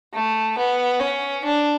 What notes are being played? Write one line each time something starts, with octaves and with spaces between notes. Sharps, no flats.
A3
B3
C#4
D4